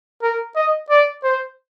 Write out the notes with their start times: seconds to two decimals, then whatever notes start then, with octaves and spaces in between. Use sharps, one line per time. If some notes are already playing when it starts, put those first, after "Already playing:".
0.23 A#4
0.56 D#5
0.90 D5
1.23 C5